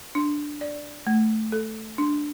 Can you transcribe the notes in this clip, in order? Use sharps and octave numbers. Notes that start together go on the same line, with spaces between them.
D4
D5
A3
A4
D4